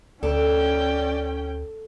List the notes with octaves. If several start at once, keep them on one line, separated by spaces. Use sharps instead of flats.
D2 C#4 A4 D5 G5